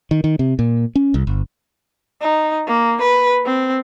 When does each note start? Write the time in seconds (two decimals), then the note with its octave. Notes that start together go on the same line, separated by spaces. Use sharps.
0.11 D#3
0.24 D#3
0.39 C3
0.59 A#2
0.96 C#4
1.14 C2
1.27 G1
2.22 D#4
2.67 A#3
3.01 B4
3.45 C4